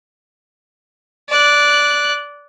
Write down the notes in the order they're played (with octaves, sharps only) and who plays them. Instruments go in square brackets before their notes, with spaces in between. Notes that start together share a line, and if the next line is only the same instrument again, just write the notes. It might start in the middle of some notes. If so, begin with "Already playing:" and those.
[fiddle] D5 F#6